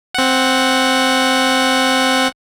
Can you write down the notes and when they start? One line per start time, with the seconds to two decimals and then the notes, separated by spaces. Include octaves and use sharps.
0.14 C4 F#5